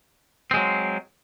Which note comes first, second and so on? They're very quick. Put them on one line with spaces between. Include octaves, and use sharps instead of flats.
C4 G#3 F#3